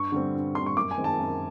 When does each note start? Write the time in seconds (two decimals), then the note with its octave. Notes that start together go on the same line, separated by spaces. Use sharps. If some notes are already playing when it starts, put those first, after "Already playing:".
Already playing: G2 C#6
0.12 D3 G3 C4
0.34 G2
0.55 D3 G3 C4 C6
0.66 C#6
0.77 F#2 D6
0.91 G#5
0.97 D#3 G#3 C4
1.04 A5
1.19 F#2